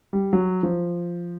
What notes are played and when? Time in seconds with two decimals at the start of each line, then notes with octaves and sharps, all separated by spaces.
0.13 G3
0.33 F#3
0.63 F3